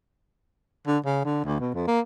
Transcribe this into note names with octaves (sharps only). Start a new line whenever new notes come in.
D3
C#3
D3
D2
B2
F2
A#3